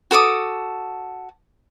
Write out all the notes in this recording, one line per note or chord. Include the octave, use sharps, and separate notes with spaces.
F#4 A4 D6 D#6